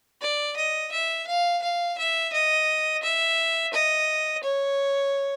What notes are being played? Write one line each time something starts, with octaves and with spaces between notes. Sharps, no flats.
D5
D#5
E5
F5
F5
E5
D#5
E5
D#5
C#5